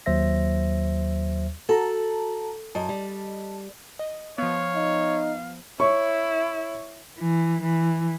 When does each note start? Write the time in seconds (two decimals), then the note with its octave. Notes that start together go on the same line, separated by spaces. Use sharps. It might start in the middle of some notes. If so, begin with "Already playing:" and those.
0.06 D#2 F#3 C5 E5 A#6
1.69 F#4 A4 A5 A#5
2.75 F#2 D#5 A5
2.89 G3
3.99 D#5
4.38 F3 B3 C#5 F5
4.75 D#4
5.80 E4 C#5 C#6
7.19 E3
7.62 E3